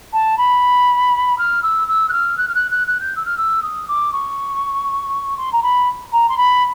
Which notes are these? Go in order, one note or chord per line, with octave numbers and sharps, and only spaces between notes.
A5
B5
F6
E6
E6
F#6
F6
F#6
F6
F#6
F#6
F#6
G6
E6
F6
E6
D#6
D6
C#6
C6
A#5
B5
A#5
C6
B5